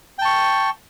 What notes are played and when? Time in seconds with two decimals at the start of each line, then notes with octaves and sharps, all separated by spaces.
0.18 G5
0.22 A5
0.25 C#6